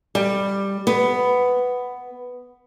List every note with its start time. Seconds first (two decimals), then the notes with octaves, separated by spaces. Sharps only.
0.15 G3
0.87 B3